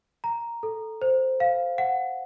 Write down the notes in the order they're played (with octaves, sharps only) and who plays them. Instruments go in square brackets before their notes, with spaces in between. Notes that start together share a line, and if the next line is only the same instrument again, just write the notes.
[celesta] A#5
A4
C5
F5
F#5